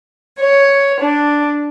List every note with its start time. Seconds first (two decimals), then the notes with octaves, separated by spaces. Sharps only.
0.39 C#5
1.00 D4